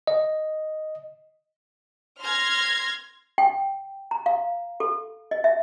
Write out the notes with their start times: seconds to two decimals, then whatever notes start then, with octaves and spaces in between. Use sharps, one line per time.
0.07 D#5
2.21 C6 F6 G#6 A#6
3.38 G5
4.11 A#5
4.26 F5
4.80 A4
5.31 D#5
5.44 E5